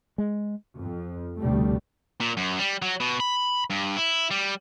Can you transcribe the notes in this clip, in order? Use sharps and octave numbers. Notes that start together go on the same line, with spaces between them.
G#3
F2
F1 D2 B2 G3 A3
A#2
F#2
G3
F#3
B2
B5
G2
E4
G3